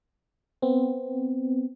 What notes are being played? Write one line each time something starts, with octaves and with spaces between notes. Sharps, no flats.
B3 C4